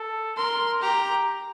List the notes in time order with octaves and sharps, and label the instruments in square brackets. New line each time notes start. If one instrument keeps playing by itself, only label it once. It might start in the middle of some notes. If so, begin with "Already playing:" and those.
Already playing: [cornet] A4
[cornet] A#4 [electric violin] C6
[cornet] G4 [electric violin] A#5